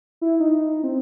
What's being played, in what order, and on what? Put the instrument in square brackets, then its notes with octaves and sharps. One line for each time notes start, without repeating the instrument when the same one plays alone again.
[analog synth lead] E4
D#4
C4